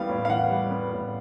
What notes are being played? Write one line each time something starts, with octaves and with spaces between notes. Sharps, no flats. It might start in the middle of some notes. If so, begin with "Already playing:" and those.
Already playing: E3 G3 B3 F5
A2
F5
E3 F#5
G3
B3
A2